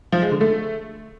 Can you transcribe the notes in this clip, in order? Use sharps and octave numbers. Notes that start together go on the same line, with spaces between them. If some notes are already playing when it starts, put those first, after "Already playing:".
F3
G#3
D3
A3